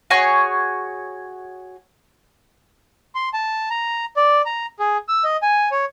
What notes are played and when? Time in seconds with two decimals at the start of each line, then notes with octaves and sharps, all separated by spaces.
0.10 F#4 G#4 C#5 G#5
3.15 C6
3.34 A5
3.70 A#5
4.17 D5
4.46 A#5
4.79 G#4
5.08 E6
5.24 D#5
5.42 G#5
5.72 C#5